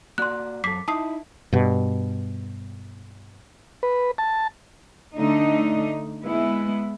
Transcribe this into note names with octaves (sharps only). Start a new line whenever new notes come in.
A#3 F#4 D5 C6 F#6
F#2 A4 D6 B6 C7
D#4 E4 A5 D#6 C7
G2 B2
B4
A5
D3 A3 D#4
G#3 B3 E4